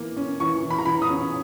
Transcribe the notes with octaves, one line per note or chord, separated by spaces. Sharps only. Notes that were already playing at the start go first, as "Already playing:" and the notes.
Already playing: E3 A#3
C#4
E3 C#6
E3
B5
A#5
E3 B5
D#6
C#4